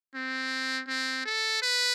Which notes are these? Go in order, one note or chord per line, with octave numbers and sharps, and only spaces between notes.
C4
C4
A4
B4